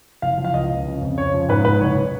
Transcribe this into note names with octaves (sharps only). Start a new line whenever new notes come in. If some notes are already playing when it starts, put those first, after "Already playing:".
F#1 F5
F3
F5
C#2 D#5
C#2
C#3
F2
C#3 C#5
F3
G#2 B4
G#2 B4
F#1 C#5